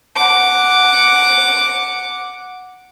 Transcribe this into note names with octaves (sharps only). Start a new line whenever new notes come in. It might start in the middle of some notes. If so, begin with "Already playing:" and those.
F#5 D6